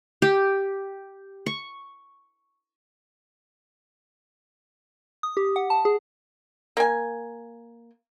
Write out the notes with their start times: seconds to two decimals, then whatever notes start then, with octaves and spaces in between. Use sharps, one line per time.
0.22 G4
1.46 C#6
5.23 D#6
5.37 G4
5.56 F#5
5.70 A5
5.85 G#4
6.77 A#3 G#5